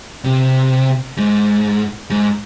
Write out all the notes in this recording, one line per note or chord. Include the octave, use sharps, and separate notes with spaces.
C3
G#2
G#2